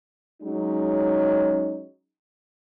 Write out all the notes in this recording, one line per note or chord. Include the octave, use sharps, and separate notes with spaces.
F#3 G#3 C#4 D#4